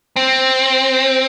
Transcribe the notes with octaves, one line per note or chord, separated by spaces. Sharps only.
C4